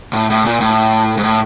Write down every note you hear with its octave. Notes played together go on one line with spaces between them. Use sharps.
A2
A2
A#2
A2
G#2
A2